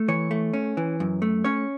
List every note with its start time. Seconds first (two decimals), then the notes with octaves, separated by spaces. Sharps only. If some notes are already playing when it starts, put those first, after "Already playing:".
Already playing: A3
0.08 E3 C#5
0.31 A3
0.53 C#4
0.77 E3
1.00 F#2
1.22 A3
1.44 C#4 C#5